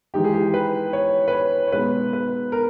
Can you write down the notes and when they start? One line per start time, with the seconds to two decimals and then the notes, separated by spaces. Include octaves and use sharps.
0.14 E3 G#3 D#4 G4
0.24 G#4
0.34 G4
0.54 B4
0.93 C#5
1.28 B4
1.33 C#5
1.67 C#5
1.72 B2 G#3 B3 D#4 B4
2.13 B4
2.52 A#4